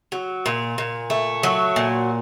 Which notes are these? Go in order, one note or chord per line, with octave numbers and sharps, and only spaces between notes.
F#3
A#2
A#2
A3
F#3
A#2